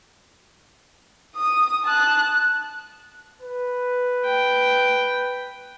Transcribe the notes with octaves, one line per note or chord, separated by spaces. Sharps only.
D#6
A5 F#6
B4
G5